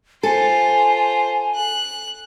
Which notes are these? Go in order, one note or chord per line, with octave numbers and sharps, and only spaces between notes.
F4 A4 C5 G#5
F#6